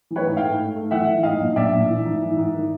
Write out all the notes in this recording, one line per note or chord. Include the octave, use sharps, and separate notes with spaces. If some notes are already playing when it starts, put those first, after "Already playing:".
E3
B4 C#5
G#2
F5 G5
A3
G#2
A3
E3 E5 F#5
E3
G#2 D#5 F5
A#1
A#1 D5 E5
A#1
E3
G#2
E3
G#2
D#3